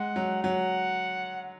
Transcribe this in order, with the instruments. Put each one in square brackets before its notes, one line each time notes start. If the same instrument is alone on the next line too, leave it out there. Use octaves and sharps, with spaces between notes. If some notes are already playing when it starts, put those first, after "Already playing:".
Already playing: [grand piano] G#3 [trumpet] F#5
[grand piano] F#3
[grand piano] F#3 [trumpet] F#5